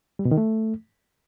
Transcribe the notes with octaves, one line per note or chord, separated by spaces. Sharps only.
G3
B2
D#3
A3